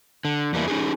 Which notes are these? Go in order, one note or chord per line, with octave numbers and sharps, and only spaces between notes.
D3
E2 G3 A#3 E4
C#4 D#4 G4 G#4